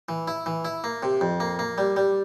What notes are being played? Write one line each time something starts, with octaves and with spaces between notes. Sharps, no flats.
E3
E4
E3
E4
A#3
C3
F2
A#3
A#3
G3
G3